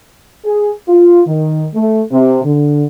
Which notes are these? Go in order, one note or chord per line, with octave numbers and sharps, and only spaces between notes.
G#4
F4
D#3
A3
C3
D3